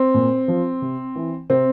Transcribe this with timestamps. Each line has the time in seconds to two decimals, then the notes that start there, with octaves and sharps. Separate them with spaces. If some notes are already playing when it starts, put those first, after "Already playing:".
Already playing: C4
0.14 A#2
0.48 F3
0.82 C3
1.15 E3
1.50 C3 C4